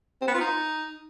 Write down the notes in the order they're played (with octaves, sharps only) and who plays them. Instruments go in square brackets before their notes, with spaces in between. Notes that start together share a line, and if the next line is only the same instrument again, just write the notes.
[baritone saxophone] C4
B3
F4
D#4